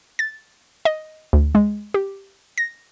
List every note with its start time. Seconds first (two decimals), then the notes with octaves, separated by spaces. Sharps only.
0.19 A6
0.85 D#5
1.33 D2
1.55 G#3
1.94 G4
2.58 A#6